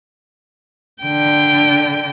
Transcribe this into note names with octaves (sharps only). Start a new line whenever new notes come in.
D3 G5